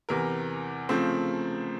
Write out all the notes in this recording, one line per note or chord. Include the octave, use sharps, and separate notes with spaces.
E2 C3 E3 A#4
C#3 F3 A3 C4